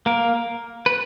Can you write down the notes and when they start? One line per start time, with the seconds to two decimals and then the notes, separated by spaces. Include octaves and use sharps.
0.06 A#3 A#4
0.86 B4